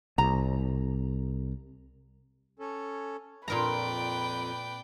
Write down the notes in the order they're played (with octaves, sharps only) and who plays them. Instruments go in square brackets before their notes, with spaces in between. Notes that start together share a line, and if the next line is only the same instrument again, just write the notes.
[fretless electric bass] C2 [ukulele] A#5
[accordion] C#4 A4
[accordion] F2 [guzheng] A#2 A#4 A#5 [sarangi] B4 [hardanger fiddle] D5 G5